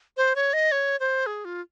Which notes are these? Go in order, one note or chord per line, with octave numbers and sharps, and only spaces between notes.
C5
C#5
D#5
C#5
C5
G#4
F4